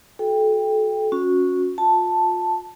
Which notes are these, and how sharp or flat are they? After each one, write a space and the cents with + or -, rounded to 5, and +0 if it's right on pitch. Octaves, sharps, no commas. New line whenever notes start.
F#4 +0 A4 -30 G5 +15
C#4 +0 F#4 -25
F4 +35 A5 +0